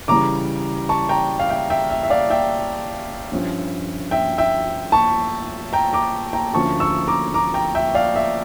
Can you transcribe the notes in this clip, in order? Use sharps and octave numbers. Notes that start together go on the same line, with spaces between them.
C#3 E3 G3 A#5 D6
A5 C#6
G5 A#5
F5
E5 G5
E5 G5
E5
E5
D5 F5
E5 G5
G2 F3 C#4
E5 G5
E5 G5
A5 C#6
G5 A#5
A#5 D6
G5 A#5
D2 D3 F3 A#3 C#4 A5 C#6
C#6 E6
A#5 D6
A#5 D6
G5 A#5
E5 G5
D5 F5
E5